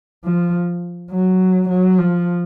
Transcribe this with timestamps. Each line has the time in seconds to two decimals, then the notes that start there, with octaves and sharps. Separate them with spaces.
0.25 F3
1.11 F#3
1.69 F#3
1.98 F3